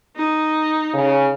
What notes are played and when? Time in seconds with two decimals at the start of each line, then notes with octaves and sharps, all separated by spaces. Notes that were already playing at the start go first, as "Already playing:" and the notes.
0.17 D#4
0.93 C#3